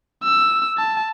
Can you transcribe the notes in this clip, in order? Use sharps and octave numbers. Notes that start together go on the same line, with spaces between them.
E6
A5